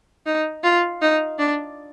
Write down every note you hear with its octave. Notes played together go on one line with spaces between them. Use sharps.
D#4
F4
D#4
D4